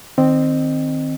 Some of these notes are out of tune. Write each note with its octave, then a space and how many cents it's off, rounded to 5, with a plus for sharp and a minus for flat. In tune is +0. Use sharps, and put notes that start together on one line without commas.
D#3 +0 C4 +0 D#5 -25